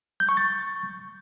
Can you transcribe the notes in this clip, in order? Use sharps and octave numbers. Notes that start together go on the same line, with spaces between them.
G6
C#6
A6